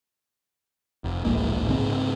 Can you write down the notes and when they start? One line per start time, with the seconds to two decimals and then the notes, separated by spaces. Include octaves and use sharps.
1.04 F1
1.25 D1 A#1 G#2 A#3
1.69 G#2 C#3 C4